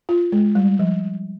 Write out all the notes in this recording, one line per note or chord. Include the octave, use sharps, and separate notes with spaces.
F4
G#3
G3
F3